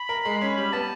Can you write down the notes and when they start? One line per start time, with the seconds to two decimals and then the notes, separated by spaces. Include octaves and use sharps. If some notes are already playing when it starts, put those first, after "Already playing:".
Already playing: B5
0.09 A#4
0.25 G#3
0.41 C#4
0.57 G3 B5
0.73 B3 A5